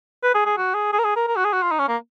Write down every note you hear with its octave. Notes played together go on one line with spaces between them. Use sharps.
B4
G#4
G#4
F#4
G#4
G#4
A#4
G#4
A#4
A#4
F#4
G#4
F#4
F4
D#4
C#4
A#3